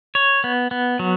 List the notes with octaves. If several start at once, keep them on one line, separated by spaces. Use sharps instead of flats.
C#5
B3
B3
F#3